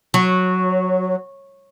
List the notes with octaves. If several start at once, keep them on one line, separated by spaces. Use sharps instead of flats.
F#3